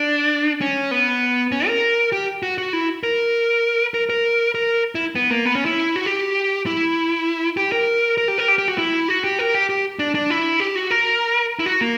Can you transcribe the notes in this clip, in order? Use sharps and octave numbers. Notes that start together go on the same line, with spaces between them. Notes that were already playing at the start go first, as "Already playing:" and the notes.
Already playing: D4
C#4
B3
C#4
A#4
G4
F#4
F#4
E4
A#4
A#4
A#4
A#4
E4
B3
A#3
B3
C#4
E4
F#4
G4
E4
G4
A#4
A#4
G4
A#4
G4
G4
F#4
E4
F#4
G4
A#4
G4
G4
D4
D4
E4
G4
F#4
A#4
E4
F#4
A#3